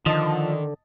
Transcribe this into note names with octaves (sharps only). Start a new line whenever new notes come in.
D3 D#3 F3 D#5 A5